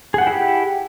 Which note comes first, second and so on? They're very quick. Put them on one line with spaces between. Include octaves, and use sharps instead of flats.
G#4 F#5 G5 E4 G4